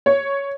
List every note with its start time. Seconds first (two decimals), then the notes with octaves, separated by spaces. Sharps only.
0.06 C#5